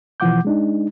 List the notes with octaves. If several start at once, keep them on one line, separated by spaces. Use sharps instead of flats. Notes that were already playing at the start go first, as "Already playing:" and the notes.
B2 E3 F3 F#5 D6 G6
G#3 D4 D#4